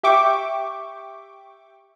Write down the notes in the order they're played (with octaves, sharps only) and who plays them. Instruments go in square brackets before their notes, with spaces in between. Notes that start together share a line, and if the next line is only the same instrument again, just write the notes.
[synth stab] G4 E5 G5 C#6 D6